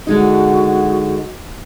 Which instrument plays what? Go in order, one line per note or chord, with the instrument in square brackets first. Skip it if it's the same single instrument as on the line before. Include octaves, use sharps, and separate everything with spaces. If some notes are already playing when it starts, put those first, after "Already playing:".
[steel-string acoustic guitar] D3 G#3 D#4 [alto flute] F#4